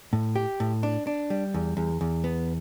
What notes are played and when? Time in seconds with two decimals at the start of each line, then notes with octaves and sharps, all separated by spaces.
0.13 A2
0.36 G4
0.60 A2
0.83 D4
1.07 D4
1.30 G3
1.54 E2
1.77 E2
2.01 E2
2.24 B3